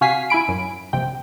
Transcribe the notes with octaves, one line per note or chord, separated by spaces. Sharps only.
C3 F#4 F5 G#5 B6 C7
E4 G#5 B5 D7
F#2
A#1 G2 C3 G5